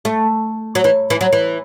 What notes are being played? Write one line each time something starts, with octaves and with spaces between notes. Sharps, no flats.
A3
F#3
E3
E3
F#3
E3